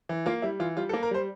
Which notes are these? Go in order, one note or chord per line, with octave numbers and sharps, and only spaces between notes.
E3
A#3 F4
G3 E4
E3 F4
G3 F4
A4
A#3
A#4
G3 C5